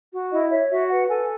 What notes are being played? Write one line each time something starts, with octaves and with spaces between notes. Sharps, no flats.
F#4
E4 D#5
C#5 E5
F#4 E5
B4 F#5
A4 G#5